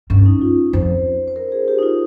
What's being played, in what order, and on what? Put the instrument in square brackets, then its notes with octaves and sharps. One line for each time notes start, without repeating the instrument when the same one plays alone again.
[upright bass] G2 [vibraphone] C#4
[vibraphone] D#4
F4
[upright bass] F2 [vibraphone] C5
[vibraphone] C5
A#4
G#4
G4
D#4
F4